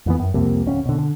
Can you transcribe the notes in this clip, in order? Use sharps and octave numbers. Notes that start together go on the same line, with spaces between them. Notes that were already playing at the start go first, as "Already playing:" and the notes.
F2 E3 B3
F#2
C2 F2 C3 A#3
D1 C#4
B2 D3
D3